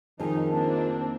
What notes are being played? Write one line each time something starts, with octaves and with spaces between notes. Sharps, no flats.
F2 D#3 F3 D#4 G#4
A#3 C4 D4 A5